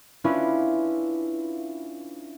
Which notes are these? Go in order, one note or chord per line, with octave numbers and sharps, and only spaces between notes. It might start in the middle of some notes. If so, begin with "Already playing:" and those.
C#4 D4 E4 F4 B4